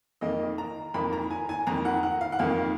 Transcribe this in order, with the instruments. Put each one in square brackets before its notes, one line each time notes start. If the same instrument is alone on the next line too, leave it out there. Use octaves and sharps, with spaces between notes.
[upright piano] F2 D#3 A#3 D#5
A#5
F2 D#3 A#3 B5
A#5
G#5
G#5
F2 D#3 A#3 A#5
F#5
F#5
F5
F#5
F2 D#3 A#3 F5